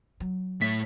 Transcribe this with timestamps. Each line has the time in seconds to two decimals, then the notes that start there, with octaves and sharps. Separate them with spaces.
0.20 F#3
0.61 A2 A3 C#5 B6